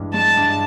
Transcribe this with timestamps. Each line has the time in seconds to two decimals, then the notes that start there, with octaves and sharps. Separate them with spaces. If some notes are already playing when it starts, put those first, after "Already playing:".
Already playing: G2 E3 G#3
0.14 G#3 A5
0.37 G2